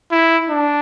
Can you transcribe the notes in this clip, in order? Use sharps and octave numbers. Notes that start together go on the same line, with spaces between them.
E4
D4